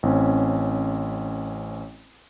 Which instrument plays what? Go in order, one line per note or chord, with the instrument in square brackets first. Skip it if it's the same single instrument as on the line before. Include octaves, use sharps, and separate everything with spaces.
[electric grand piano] A1 C4 C#4